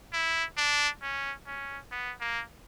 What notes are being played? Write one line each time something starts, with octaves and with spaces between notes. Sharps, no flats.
E4
D4
C#4
C#4
B3
A#3